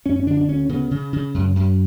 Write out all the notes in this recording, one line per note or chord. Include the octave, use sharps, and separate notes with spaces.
F#2 C#4
C#4
D3 D4
D4
D2 C#4
C#3 B3
C#3
C#3
F#2
F#2